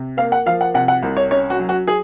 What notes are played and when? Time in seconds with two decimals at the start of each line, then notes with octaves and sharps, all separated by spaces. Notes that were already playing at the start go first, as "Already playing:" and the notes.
Already playing: C3
0.17 A#3 F5
0.32 F#5
0.46 F3 F5
0.61 F#5
0.74 C3 F#5
0.88 F#5
1.03 C2
1.17 C#5
1.31 C#4 C#5
1.50 F#4
1.60 F#3
1.69 F#4
1.87 G#4